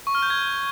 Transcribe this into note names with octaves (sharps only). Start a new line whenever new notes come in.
C#6
F6
G6
G#6